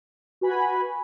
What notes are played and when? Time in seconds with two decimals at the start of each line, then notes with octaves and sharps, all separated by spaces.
0.41 F#4 B4 G#5 B5